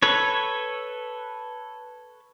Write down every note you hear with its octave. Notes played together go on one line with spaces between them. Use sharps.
A4 B4 C#5